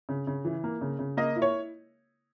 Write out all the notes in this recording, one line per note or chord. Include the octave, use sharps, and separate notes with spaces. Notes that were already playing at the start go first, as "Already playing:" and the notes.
C#3
C#3
E3
A#3
C#3
C#3
A#3 D#5
E4
C#5